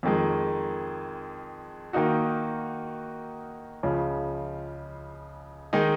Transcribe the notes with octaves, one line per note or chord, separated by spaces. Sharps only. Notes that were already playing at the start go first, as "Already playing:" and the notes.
F2 D#3 G#3
D#3 A#3 D#4 F#4
C#2 C#3 F3
D#3 G#3 D#4